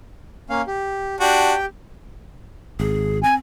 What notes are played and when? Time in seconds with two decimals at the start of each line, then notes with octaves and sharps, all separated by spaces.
0.50 A#3 C#4 F5
0.67 G4
1.21 D4 F#4 G4 G5
2.80 G#1 G#4
3.24 C4 G#5